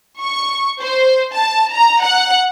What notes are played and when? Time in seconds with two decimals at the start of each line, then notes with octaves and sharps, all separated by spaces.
0.21 C#6
0.81 C5
1.33 A5
1.74 A#5
2.03 F#5